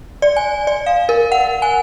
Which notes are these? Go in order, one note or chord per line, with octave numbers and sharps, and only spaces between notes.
D5
G#5
D5
F5
A#4
F#5
G#5